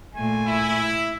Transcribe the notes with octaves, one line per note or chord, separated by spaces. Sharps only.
A#2 A3 G#5
E4